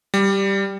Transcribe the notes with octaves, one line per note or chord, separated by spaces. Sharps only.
G3